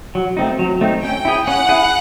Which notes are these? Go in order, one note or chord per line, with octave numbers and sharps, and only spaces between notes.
F#3
A3 C4 D#4
F#3
A3 C4 D#4
C#4 G5
E4 G#4
C#4 F#5
E4 G#4